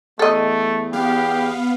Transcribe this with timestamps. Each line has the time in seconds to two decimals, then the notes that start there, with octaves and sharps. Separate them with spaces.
0.19 E2 A3 A4 D#5
0.93 B3 G4 F5